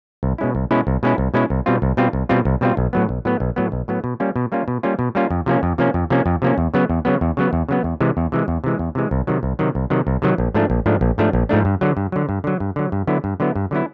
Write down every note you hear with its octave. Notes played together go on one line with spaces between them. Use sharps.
C2
B2 G#3 C#4 E4
C2
B2 G#3 C#4 E4
C2
B2 G#3 C#4 E4
C2
B2 G#3 C#4 E4
C2
B2 G3 C4 F4
C2
B2 G3 C4 F4
C2
B2 G3 C4 F4
C2
B2 G3 C4 F4
B1
A2 F#3 B3
B1
A2 F#3 B3
B1
A2 F#3 B3
B1
A2 F#3 B3
B2
G3 A#3 C#4 F4
B2
G3 A#3 C#4 F4
B2
G3 A#3 C#4 F4
B2
G3 A#3 C#4 F4
F2
C3 F3 A#3 C#4
F2
C3 F3 A#3 C#4
F2
C3 F3 A#3 C#4
F2
C3 F3 A#3 C#4
E2
C#3 F#3 B3
E2
C#3 F#3 B3
E2
C#3 F#3 B3
E2
C#3 F#3 B3
E2
C3 E3 G#3
E2
C3 E3 G#3
E2
C3 E3 G#3
E2
C3 E3 G#3
C2
C3 D#3 F#3
C2
C3 D#3 F#3
C2
C3 D#3 F#3
C2
C3 D#3 F#3
A#1
G#2 F3 A3 D4
A#1
G#2 F3 A3 D4
A#1
G#2 F3 A3 D4
A#1
G#2 F3 A3 D4
G2
D3 F#3
G2
D3 F#3
G2
D3 F#3
G2
D3 F#3
G2
D3 F#3 B3 E4
G2
D3 F#3 B3 E4
G2
D3 F#3 B3 E4